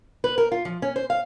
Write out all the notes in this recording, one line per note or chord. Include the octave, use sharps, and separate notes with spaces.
B4
A#4
F4
F3
C#4
C5
F5